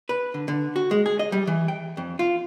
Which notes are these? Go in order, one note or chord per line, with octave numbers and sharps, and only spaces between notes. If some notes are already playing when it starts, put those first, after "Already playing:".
B4
D3
D3
F#4
G#3
G#4
D#5
G3
E3
G5
F2
F4